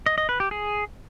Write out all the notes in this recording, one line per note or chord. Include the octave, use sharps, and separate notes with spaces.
D#5
D#5
B4
G4
G#4